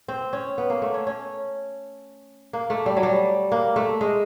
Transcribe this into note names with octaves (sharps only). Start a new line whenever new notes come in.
C4
C#4
B3
A#3
A3
C#4
C#4
A#3
A3
G3
F#3
G3
A#3
A3
G#3